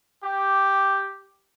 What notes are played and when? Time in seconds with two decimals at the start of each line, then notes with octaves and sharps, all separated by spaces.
0.24 G4